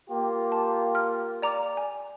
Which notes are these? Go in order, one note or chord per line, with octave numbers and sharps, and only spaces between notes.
A#3 F4 G4
A5
F6
D5 A#5 D6
G#5